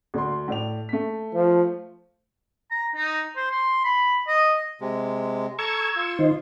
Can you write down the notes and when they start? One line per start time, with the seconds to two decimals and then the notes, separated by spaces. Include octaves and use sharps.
0.14 D2 D5 C6
0.48 A2 D5 F7
0.89 A3 B6
1.34 F3
2.71 A#5
2.95 D#4
3.36 C5
3.51 C6
3.85 B5
4.27 D#5
4.81 C3 G#3
5.59 A4 A#5 C#6 E6 G#6
5.96 F4
6.19 D#3 D#4 C5